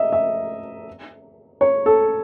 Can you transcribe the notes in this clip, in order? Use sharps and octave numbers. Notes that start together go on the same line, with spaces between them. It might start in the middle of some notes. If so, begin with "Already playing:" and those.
Already playing: D#5 E5
E5
C#5
A4